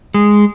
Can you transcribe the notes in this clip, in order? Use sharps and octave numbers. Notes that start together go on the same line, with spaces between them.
G#3